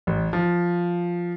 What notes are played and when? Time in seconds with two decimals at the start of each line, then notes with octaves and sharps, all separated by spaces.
0.07 A1
0.33 F3